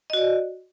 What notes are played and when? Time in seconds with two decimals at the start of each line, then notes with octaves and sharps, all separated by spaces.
0.10 D#5
0.13 F#4
0.17 D5